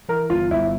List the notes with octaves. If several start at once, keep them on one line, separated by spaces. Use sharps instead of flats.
E3 A#4
G1 F4
G1 E4